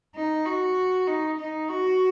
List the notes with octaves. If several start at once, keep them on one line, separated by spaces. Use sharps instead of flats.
D#4
F#4
D#4
D#4
F#4